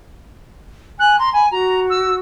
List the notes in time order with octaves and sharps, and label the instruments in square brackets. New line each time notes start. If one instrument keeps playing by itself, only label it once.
[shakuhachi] G#5 [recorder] F#6
[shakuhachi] A#5 [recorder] C6
[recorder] G#5 [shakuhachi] B5
[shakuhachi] F#4 [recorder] A#5
[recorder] E6